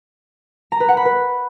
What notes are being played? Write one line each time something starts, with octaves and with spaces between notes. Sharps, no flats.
A#5
B4
F#5
B5
B4